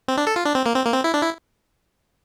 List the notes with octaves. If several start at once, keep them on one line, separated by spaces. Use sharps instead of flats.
C4
D4
A4
F4
D4
C4
A#3
C4
A#3
C4
E4
D4
E4